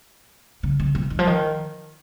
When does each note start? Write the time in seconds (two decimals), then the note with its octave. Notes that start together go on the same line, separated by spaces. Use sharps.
0.63 C#3
0.80 C#3
0.95 C3
1.10 D#3
1.19 F3
1.27 D#3